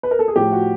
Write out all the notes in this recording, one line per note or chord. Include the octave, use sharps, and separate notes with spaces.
B4
A#4
A4
G#4
A2 F3 G4
F#4